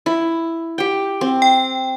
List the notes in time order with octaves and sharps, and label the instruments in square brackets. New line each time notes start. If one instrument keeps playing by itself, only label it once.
[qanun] E4
G4 G5
C4
[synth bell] G5